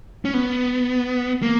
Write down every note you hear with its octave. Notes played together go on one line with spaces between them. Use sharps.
C#4
B3
A#3